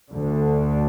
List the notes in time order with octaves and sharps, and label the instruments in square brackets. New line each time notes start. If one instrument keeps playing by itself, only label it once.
[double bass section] D2 D3